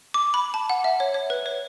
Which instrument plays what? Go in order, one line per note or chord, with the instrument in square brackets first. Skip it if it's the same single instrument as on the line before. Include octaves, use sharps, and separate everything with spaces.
[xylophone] D6
B5
A5
F#5
E5
C#5
C#5
B4
C#5